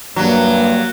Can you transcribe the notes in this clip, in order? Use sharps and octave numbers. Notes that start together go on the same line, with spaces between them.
G2 F#3 A#3